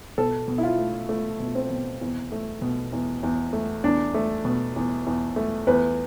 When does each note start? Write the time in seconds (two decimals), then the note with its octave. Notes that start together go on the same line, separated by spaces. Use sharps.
0.18 B2 A4
0.48 B2
0.58 E4
0.63 F4
0.78 A3
1.09 A3
1.40 B2
1.55 C4
1.70 B2
2.01 E2
2.32 A3
2.62 B2
2.92 E2
3.23 E2
3.53 A3
3.84 E2 D4
4.14 A3
4.45 B2
4.76 E2
5.07 E2
5.36 A3
5.67 E2 B4